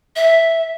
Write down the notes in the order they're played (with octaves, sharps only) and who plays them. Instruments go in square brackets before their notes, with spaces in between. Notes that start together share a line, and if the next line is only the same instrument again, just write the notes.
[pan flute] E5